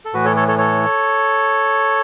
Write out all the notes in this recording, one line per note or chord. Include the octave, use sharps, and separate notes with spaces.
A4
A2 E3 F#4 B4
A4 C#5
A4 C#5
A4 C#5
A4 C#5